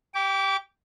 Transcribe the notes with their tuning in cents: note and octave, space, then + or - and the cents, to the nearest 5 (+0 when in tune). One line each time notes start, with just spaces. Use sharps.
G4 +0 D6 -30